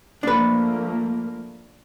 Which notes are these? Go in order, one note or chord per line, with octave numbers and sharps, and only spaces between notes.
F3 A3 A#3 D4 B4